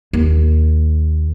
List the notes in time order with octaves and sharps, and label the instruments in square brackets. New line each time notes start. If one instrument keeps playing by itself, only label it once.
[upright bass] D#2